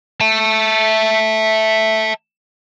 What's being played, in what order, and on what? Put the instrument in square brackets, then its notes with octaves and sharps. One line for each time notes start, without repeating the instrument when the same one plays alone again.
[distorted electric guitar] E5 A5